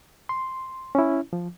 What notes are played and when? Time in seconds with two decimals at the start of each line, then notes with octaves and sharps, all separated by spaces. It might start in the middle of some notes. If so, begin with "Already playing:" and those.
0.29 C6
0.95 C#4 E4
1.33 F3